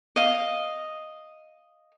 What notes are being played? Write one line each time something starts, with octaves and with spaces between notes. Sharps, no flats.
D#5 F5